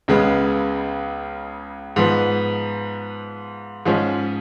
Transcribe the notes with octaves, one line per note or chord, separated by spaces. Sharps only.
C#2 C#3 G#3 B3
G#2 F3 B3
G#2 F3 G#3 C#4